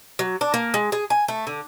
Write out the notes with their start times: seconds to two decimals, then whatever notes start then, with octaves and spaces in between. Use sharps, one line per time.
0.19 F#3
0.41 D4
0.54 A#3
0.74 G#3
0.92 G#4
1.10 G#5
1.28 A3
1.47 D3